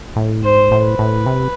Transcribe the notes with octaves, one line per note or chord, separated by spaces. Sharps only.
A2
G#2 C5
A2
B4
A2
C3